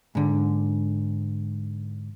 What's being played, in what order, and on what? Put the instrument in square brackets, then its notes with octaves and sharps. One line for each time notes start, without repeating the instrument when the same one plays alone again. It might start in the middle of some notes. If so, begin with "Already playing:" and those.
[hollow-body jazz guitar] G#2 D3